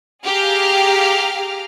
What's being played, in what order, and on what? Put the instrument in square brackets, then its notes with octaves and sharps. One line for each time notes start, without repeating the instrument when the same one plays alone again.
[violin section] G4 G#4 F5 A#5 F6